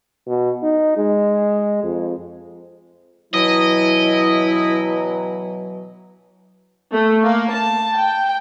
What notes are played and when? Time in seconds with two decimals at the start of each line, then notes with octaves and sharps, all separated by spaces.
0.27 B2
0.63 D#4
0.97 G#3
1.83 F2
3.34 B2 E3 F#3 E4 D#5
6.92 A3
7.24 A#3
7.54 A5
7.97 G5